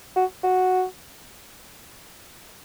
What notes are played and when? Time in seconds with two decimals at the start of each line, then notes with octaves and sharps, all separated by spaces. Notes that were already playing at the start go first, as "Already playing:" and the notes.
0.16 F#4
0.44 F#4